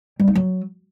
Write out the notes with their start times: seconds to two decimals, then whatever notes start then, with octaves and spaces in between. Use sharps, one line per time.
0.20 G3
0.28 D#4
0.35 F#3